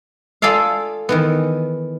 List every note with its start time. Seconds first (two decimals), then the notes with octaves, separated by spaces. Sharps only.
0.42 F4 G#4 A4 D5 E5 F5
1.09 D#3 E3 B3